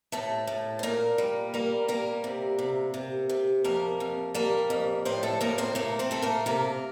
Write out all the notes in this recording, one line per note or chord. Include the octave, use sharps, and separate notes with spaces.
A2 A3 A4
A2
C5
A#2 A#3 A#4
G3
G3 A#3 A#4
G3 A#3 A#4
C3
C3
C3
C3
F2 A#3 A#4
F2
G3 A#3 A#4
F2
A2 C4 C5
A3 A4
A2 A#3 A#4
C4 C5
A3 A#3 A#4
C4 C5
A3 A4
A#3 A#4
C3 A#3 A#4